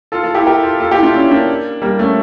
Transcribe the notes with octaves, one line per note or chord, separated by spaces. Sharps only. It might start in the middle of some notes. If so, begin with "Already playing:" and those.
F4 A4
F4 A4
E4 G4
G4 A#4
F4 A4
F4 A4
E4 G4
D4 F4
C#4 E4
A#3 D4
G3 A#3
A3 C#4